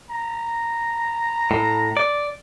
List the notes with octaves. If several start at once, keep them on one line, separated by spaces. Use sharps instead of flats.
A#5
A2
D5